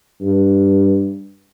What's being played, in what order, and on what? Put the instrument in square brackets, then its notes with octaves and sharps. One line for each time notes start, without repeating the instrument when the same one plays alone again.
[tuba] G2